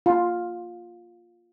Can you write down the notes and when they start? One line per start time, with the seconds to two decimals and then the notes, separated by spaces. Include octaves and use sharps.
0.06 F4